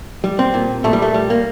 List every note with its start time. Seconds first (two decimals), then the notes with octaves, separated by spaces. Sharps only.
0.24 G3
0.39 C4
0.54 A#2
0.84 A#2 A3
0.93 G3
1.02 A3
1.14 G3
1.30 A#3